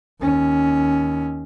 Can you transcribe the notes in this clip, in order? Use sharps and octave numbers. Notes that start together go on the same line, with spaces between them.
D#2 C#4